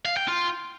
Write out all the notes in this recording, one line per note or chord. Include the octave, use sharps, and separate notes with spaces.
F5
G5
F4